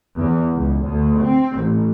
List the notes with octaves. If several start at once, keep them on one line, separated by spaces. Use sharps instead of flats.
E2
C#2
D2
C4
A1